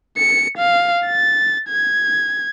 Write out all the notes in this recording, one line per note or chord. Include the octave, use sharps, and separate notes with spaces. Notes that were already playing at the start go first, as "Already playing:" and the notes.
C#7
F5
A6
G#6